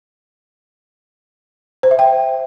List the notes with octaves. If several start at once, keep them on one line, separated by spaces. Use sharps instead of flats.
C5
E5
G5